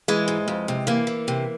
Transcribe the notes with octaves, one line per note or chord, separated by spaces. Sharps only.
E3 G#3
G#2
F2
C3
E3 A#3
E3
C3